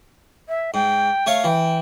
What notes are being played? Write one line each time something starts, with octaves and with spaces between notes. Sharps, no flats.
E5
G#2 G5
A3 C#5 F5
E3 G5